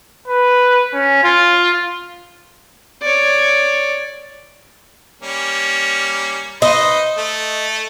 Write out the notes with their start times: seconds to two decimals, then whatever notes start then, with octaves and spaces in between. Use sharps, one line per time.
0.27 B4
0.93 C#4
1.23 F4
3.02 C#5 D5
5.22 G3 A#3 C#4
6.62 D#4 B4 C5 D#5
7.18 A3